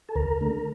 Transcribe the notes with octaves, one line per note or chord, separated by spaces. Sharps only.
A4
D2 A#4
D3 A3